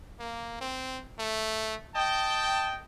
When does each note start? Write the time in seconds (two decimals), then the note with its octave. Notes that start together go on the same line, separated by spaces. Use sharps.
0.20 A#3
0.61 C4
1.19 A3
1.95 D#5 G5 A5